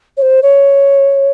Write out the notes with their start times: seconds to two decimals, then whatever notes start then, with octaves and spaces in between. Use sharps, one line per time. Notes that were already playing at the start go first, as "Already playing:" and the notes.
0.17 C#5
0.22 C5
0.43 C#5